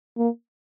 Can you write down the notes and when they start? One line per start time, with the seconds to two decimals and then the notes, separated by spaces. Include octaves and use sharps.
0.18 A#3